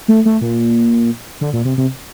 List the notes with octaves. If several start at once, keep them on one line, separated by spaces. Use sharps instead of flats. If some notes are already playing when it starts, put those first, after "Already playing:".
A3
A3
A#2
D3
A#2
C3
C3